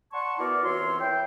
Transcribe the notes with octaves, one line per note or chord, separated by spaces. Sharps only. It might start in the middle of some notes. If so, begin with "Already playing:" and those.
D5 F#5 A5 C6 C#6
E3 B3 E4 F#4 A#4 D5
C2 E3 F4 C#5 E5 C6
E4 G5